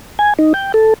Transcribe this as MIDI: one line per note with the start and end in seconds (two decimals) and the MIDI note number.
0.19 0.34 80
0.39 0.53 63
0.54 0.72 79
0.74 0.94 69